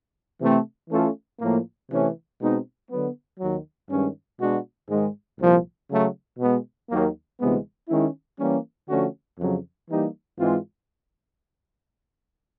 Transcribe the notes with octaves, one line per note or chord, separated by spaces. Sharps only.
C3 E3 A3 C4
E3 A3 C#4 F4 A4
A2 F3 A#3
C3 E3 A3 C#4
B2 G#3 C4 D#4
D3 F#3 B3
D#2 D#3 F#3
G2 D#3 G#3 C#4
B2 G#3 B3 D4 F#4
G#2 D#3 G#3
C2 A#2 F3
C#3 F#3 A3
B2 G#3 B3
D#2 D#3 F#3 A#3
D2 C3 E3 G#3 B3
D#3 G#3 C#4 E4
E3 G3 A#3 C#4
D3 F3 A3 C#4 F#4
F2 C#3 F#3
E3 G3 A#3 D#4 G4
G#2 E3 G#3 C4 F4